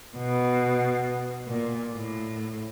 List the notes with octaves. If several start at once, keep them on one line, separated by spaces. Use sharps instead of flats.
B2
A#2
A2